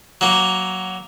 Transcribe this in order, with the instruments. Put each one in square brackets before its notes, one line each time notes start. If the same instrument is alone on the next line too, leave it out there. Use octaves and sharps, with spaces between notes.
[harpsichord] F#3 A#3